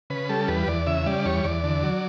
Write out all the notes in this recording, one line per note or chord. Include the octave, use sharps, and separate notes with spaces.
C#3 B4
G3 A4
E2 B4
E2 D5
C#3 E5
G3 D5
E2 C#5
E2 D5
D3
F#3